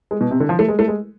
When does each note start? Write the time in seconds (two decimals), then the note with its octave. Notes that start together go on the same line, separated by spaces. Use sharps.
0.11 G#3
0.21 B2
0.31 C3
0.40 D3
0.49 F3
0.59 A3
0.68 G#3
0.79 A3
0.88 G#3